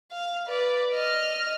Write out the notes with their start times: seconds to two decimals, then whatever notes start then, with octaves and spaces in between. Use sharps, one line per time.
0.11 F5
0.47 B4 D5
0.94 D#5 F6